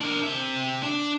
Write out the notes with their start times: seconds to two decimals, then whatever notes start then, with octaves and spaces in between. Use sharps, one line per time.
0.01 D4 A#4
0.23 C3 E5
0.83 D4